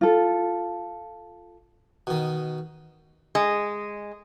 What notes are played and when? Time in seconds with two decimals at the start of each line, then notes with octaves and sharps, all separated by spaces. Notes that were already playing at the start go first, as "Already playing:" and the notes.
0.01 F4 A4
2.07 B2 D#3
3.35 G#3